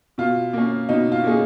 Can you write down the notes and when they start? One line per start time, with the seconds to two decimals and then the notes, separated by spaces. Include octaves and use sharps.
0.18 B2 F4
0.53 A#3 C#4
0.89 B2 D#4
1.12 F4
1.24 A#3 C#4 G#4